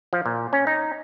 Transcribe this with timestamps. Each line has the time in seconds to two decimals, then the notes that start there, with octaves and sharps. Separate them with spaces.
0.13 F3
0.26 A#2
0.53 C#4
0.67 D#4